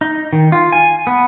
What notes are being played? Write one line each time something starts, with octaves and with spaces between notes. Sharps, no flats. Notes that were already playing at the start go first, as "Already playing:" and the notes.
D#4
D#3
F4
G#5
B3